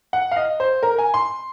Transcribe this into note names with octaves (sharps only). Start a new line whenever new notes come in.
F#5
F5
D#5
C5
A#4
G#5
C6